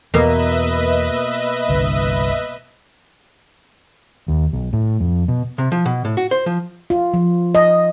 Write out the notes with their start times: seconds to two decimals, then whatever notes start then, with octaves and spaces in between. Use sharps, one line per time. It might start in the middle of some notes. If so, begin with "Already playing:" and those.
0.14 E2 B2 A#3 B4 D#5 E5
1.68 G1 C2 D3
4.28 D#2
4.53 B1
4.73 A2
5.00 F2
5.28 B2
5.58 C3
5.72 F3
5.86 B2
6.05 A2
6.17 F#4
6.31 C5
6.46 F3
6.90 F4
7.14 F3
7.55 D#5